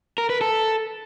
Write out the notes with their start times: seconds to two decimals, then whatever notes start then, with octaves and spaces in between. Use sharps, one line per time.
0.18 A#4
0.30 B4
0.41 A4